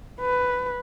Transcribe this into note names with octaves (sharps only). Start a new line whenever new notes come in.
B4